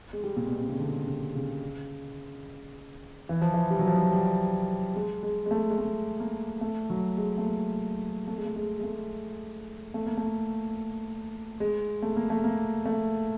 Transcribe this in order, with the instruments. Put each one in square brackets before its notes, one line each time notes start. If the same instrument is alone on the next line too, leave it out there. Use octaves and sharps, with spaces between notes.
[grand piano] G#3
G3
A#2
B2
C3
C#3
D3
C#3
C#3
E3
F3
E3
G3
F#3
F3
F#3
G3
G#3
G#3
G#3
A3
G#3
A3
A#3
A3
F#3
G#3
A3
A#3
A3
G#3
A3
G#3
G#3
A3
A3
A#3
A3
G#3
A3
A#3
A3
A#3
A3